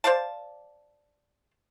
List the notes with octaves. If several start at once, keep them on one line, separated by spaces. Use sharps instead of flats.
C5 D5 F5 A5